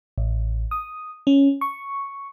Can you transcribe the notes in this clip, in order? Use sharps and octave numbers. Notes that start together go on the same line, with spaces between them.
A1
D#6
C#4
C#6